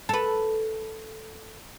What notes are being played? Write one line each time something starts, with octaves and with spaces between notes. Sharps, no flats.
A4 B4